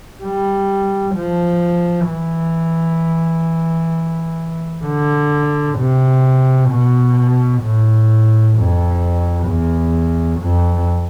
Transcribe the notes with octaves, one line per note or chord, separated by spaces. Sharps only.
G3
F3
E3
D3
C3
B2
A2
F2
E2
F2